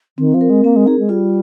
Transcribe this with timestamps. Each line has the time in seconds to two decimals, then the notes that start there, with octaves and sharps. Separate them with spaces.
0.18 D#3 C4
0.34 F3
0.41 A#4
0.49 G#3
0.64 A#3 C4
0.76 G#3
0.86 D#4 G#4
0.99 G#3
1.09 G3 F4